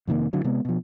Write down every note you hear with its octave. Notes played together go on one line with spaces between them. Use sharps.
F2 C3 D#3 A#3
A1 D3 E3 F#3
C3 G#3 B3
B2 F3